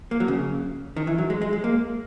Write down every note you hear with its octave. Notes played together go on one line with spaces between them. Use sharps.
A#3
F#3
C#3
D#3
E3
F#3
G#3
G#3
G#3
A#3